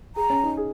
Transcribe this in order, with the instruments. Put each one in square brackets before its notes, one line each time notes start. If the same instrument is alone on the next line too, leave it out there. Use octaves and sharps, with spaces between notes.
[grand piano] G#4 [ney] A#5
[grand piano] C#4
D#4
G#4